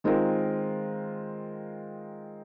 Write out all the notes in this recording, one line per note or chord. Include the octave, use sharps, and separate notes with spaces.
D#3 G#3 C4 F4 A#4